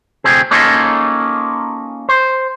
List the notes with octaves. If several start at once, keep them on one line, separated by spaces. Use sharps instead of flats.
D2 C3 C4 G#4
A#3 C#4 D#4 F4 G#4 A4
C5